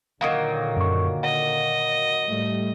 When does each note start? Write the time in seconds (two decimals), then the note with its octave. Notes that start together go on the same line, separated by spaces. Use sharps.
0.21 A#2 D3 D#3 F#3 A#3
0.77 F#2 C#6
1.23 D#5 F#5
2.26 A2 G3 A3